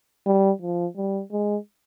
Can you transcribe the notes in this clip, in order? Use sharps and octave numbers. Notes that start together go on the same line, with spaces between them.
G3
F3
G3
G#3